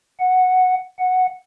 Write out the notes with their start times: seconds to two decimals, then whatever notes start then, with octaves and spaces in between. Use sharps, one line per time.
0.20 F#5
0.99 F#5